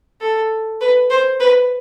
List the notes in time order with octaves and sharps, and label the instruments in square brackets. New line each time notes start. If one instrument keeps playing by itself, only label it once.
[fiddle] A4
B4
C5
B4